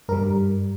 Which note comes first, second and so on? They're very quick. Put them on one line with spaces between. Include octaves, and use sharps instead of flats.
G2 A#4 G3